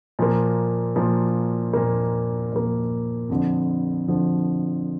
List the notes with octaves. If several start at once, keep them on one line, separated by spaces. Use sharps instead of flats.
A#2 F3 A#3
A#2 F3 A#3
A#2 F3 A#3
A#2 F3 A#3
F2 D3 F3
F2 D3 F3